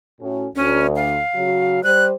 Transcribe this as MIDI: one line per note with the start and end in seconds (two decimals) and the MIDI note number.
0.20 0.46 45
0.20 0.46 61
0.20 0.46 66
0.56 1.19 38
0.56 0.87 61
0.96 1.83 77
1.35 1.83 49
1.35 1.83 54
1.35 1.83 66
1.83 2.13 55
1.83 2.13 72
1.83 2.05 90